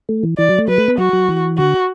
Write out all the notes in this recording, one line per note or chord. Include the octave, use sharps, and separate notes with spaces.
A3
E3
E3 D5
F#3
A3
F#3 B4
A3
B3
F#3 F#4
F#3
E3
D3 F#4